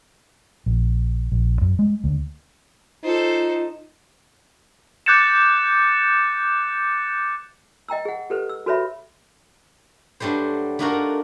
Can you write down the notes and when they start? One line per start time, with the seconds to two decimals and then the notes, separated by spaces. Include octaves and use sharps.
0.66 A#1
1.32 A#1
1.61 F#2
1.79 G#3
2.04 D2
3.04 D#4 F4 A4 C5
5.06 D6 F#6 G6 A6 C#7 E7
7.88 D#5 G5 A#5 E6
8.05 G#4 F#5
8.30 G4 A4 B4 C5
8.49 E6
8.66 F#4 A4 B4 C#5 E5 B5
10.20 G2 F#3 G3 A3 C5
10.79 A3 D4 D#4 F4 F#4 A#4